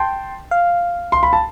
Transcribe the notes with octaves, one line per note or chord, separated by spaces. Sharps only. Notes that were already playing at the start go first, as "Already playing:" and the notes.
Already playing: G5 A5 C6
F5
C6
B5
A5